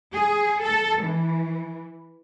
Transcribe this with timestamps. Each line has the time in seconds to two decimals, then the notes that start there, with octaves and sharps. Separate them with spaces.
0.15 G#4
0.63 A4
1.04 E3